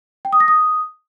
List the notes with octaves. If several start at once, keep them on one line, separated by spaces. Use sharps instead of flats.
G5
D#6
A#6
D#6